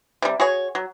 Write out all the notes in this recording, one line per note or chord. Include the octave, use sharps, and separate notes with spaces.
C3 G3
F#4 G#4 C#5
F#3